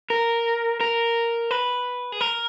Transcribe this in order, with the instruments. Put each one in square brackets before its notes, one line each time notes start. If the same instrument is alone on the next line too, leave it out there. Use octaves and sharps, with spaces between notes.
[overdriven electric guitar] A#4
A#4
B4
G#4
A#4